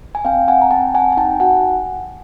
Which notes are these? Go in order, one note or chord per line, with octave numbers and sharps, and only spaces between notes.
G#5
C4 F5 G5
C4 F#5 G#5
A#5
C4 G5 A5
C4 F#5 G#5
G#5
D#4 G5 A5
F#4 F#5 G#5